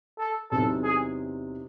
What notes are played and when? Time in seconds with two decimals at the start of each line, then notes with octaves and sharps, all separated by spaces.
0.19 A4
0.51 E2 C3 F#3 C4 D#4 A4
0.83 G#4